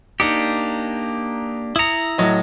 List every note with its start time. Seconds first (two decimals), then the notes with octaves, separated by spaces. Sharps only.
0.20 A#3 D4 D#4 G4 C#7
1.76 E4 A#5 D#6 C#7
2.18 A2 F#3 D#5